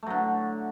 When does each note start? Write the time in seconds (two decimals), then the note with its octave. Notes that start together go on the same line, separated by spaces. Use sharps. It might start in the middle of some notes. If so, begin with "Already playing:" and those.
0.03 A3
0.07 F#3
0.10 D3